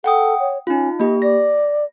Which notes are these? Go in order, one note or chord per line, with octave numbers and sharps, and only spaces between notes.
A4 F#5 G5 D#6
C#5
C#4 D#4 F4
A#3 G4 D#5
D5 A#6